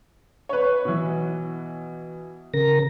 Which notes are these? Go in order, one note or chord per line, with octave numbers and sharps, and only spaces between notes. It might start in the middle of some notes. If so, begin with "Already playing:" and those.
B4 C#5
B2 E3
C#3 A#4 A#6